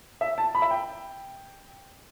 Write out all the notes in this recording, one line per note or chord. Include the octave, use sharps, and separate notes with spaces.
E5
A5
B5
E5
G5